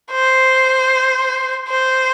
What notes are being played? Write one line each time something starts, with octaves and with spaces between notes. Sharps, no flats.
C5
C5